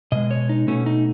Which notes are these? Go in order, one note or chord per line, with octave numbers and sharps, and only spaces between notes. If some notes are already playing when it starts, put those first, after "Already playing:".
B2 G#3 D#5
C#5
D#4
B2 A3 C#4
D#4